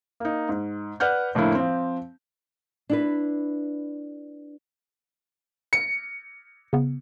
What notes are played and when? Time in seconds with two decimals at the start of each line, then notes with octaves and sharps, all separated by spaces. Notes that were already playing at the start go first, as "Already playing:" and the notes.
0.20 A#3 D#4
0.49 G#2
1.00 B4 D5 F#5 F6 G6
1.35 F2 A2 D3 A#3 E4
1.55 F3 C4
2.89 D4 E4 B4
5.73 C#7
6.73 C#3 B3